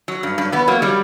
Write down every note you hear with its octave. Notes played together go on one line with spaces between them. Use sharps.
F#3
G2
G2
E2 B3
F#3 A#3
F#3 G3